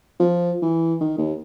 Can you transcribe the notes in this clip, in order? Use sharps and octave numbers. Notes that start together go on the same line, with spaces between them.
F3
E3
D#3
D#2